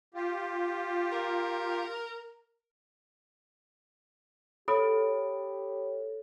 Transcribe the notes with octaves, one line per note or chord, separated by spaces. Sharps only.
F4 G4
A#4
G4 A4 C#5 B5 D#6 D7